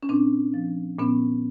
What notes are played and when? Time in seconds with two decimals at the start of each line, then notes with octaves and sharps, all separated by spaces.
0.03 C#4
0.09 A#2 C4 D4
0.54 F3
0.99 A#2 B3 C#4